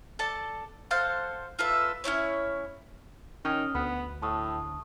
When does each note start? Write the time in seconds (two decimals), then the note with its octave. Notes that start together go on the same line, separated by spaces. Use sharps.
0.19 A4 D5 A5
0.91 A4 C5 F5 F#5
1.59 F4 A4 B4 E5
2.04 C#4 D#4 E4 C#5
3.45 D#3 C#4 D#6 F6
3.75 D2 B3 B5
4.22 A2 A5 C#6 D#6